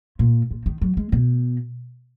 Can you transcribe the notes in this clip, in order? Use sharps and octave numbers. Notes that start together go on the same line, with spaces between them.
A#2
A#2
D#3
F#3
G#3
B2